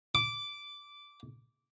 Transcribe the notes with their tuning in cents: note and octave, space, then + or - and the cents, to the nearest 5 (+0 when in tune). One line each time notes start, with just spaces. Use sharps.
D6 -10